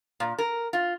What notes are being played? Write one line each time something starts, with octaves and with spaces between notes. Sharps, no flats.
A#2
A#4
F4